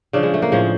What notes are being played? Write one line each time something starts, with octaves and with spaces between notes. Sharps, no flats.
C#3 F3 D4
G#3
A3
A#3
A2 F3 G#3